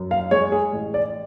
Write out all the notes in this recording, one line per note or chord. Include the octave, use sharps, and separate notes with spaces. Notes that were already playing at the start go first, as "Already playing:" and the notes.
Already playing: F#2
F5
G#3 C#5
G#4
A1
D5